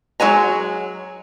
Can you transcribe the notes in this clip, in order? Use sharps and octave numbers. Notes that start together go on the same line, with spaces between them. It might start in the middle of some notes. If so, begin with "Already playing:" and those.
F#3 G#3 G#5 A#5